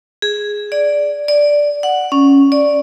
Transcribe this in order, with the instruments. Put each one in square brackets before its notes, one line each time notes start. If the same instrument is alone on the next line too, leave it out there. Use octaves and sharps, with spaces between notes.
[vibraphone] G#4
D5
D5
F#5
C#4
D5